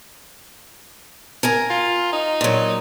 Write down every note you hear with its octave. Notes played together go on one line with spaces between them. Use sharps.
A#4 G#5 A#5
F4
D#4
A#2 F#3